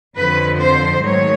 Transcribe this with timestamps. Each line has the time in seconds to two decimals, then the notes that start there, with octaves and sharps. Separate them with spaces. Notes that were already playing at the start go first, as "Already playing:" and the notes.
0.18 F2 D3 F3 B4
0.60 C5
1.04 G#2 D#3 F#3 A3 C#5